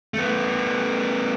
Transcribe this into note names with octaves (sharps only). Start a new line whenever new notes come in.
A3 B3